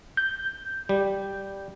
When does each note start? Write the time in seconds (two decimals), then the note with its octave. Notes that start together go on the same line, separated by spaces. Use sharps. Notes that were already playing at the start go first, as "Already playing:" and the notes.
0.17 G6
0.89 G3